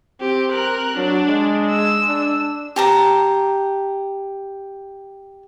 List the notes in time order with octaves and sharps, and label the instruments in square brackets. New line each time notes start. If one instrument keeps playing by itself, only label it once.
[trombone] C4 [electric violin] G4
[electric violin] A#4 F#6
[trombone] F#3 [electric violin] D4
[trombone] G#3
[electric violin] E6
[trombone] D4
[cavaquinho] G4 A5 A#5